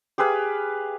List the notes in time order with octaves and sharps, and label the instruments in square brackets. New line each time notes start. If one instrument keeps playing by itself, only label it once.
[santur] G4 G#4 B4 F5